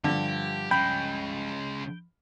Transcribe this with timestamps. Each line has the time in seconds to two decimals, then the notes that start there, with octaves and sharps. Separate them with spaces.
0.04 G2 D3 F3 G3 G4
0.71 C#3 G#3 G5 B5